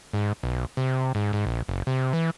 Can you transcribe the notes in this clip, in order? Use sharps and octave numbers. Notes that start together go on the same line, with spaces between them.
G#2
B1
C3
G#2
G#2
A#1
F#1
C3
E3